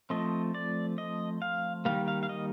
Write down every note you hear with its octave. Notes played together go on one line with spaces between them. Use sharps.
F3 A3 C4 D#5
D5
D#5
F5
D#3 G3 A#3 F5
F5
F5
D#5